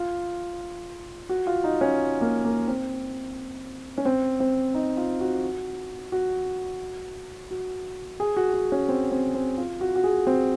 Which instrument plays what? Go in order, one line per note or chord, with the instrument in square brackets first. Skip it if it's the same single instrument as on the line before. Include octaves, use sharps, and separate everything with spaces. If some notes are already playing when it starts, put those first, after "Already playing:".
Already playing: [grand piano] F4
F#4
F4
D#4
C#4
A#3
A#3
C4
C#4
C4
C4
D#4
F4
F#4
F#4
F#4
G#4
F#4
F#4
C#4
C4
C4
C4
F4
F#4
F#4
G#4
C4